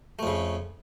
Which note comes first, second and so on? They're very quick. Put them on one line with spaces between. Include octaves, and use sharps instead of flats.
A3 F2 C#3